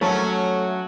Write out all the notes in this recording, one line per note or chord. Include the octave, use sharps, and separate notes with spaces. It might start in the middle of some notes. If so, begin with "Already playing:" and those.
F#3 A3 C#4 A4